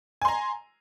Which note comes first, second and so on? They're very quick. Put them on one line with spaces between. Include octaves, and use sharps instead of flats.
G#5 C6 A#5